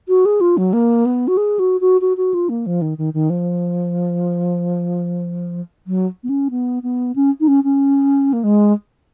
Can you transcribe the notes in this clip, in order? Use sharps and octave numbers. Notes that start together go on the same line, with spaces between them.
F#4
G#4
F4
F#3
A#3
B3
F#4
G#4
F#4
F#4
F#4
F#4
F4
A#3
F3
D#3
D#3
D#3
F3
F#3
B3
C#4
B3
B3
C#4
D#4
C#4
C#4
A#3
G#3